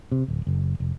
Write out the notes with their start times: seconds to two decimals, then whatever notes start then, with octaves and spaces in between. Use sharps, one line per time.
0.12 C3
0.28 D1
0.47 F#1
0.80 F1